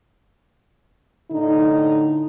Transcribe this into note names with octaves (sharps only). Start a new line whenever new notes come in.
A2 D3 D#4